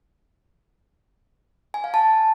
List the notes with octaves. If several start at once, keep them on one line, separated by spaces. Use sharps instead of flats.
G#5
F5
A5